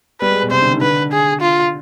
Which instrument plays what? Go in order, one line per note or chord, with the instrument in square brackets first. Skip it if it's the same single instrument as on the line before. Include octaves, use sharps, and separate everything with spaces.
[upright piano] G3 [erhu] B4
[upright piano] G#3
B2
[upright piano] C3 [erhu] C5
[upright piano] D3
D#3
[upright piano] D3 [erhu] B4
[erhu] G#4
F4